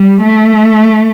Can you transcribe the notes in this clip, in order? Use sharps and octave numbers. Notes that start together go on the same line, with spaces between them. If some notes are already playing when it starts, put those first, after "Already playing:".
Already playing: G3
A3